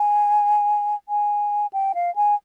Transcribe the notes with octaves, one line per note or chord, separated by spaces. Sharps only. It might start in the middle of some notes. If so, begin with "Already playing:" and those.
Already playing: G#5
G#5
G5
F5
G#5